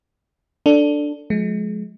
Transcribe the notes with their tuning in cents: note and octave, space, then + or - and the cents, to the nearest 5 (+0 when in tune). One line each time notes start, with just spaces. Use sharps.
D4 +0 A4 +10
F3 +45 G#3 +35